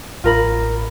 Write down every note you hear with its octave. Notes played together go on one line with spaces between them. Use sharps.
A1 A2 F4 A#4 B5